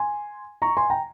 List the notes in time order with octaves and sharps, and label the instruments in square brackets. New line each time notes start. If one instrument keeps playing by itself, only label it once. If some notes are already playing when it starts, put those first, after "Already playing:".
Already playing: [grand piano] G#5 C6
A#5 C#6
G#5 C6
G5 A#5